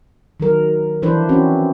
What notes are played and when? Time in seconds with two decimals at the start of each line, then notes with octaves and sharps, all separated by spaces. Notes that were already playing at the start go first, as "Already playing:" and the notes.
0.40 D#3 F#3 A#4
1.02 E3 F3 D4 B4 C5
1.29 E3 C4 C#4 F#4